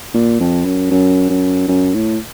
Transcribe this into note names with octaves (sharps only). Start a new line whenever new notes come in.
A#2
F2
F#2
F#2
F#2
F#2
A2